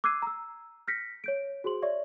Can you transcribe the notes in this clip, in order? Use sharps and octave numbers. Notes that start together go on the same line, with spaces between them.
D6 E6 F#6 G#6 C7 D#7
A#5 E6
F6 G6 A#6 B6 C#7
C#5 G6 D7
F#4 G#4 C5 C6 F#7
C#5 D5 E5 C#6